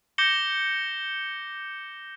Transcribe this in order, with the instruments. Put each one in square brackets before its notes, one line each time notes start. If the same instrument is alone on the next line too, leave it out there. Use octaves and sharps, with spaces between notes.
[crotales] D6 G6 A#6 C#7 E7 G7